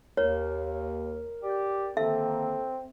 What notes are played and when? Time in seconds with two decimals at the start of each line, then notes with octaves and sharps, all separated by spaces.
0.17 D#2 A#4 C#5
1.43 G4 D5
1.97 D3 D#3 A#3 C4 A4 E5